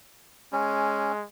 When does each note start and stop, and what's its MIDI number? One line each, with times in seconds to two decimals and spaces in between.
0.53 1.25 56
0.53 1.12 61